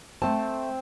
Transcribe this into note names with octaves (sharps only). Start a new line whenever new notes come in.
A3 C4 A5